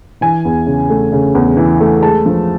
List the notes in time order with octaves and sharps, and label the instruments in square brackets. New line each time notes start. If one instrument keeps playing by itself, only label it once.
[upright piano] E3 G#5
E2
C#3
A3
C#3
E2
E3
A3
G#3 A5
F3